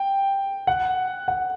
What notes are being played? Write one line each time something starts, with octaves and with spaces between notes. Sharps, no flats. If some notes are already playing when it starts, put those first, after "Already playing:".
Already playing: G5
F#5
F#5